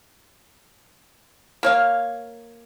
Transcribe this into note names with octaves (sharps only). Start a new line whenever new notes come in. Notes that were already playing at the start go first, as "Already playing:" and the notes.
A#3 C#5 F5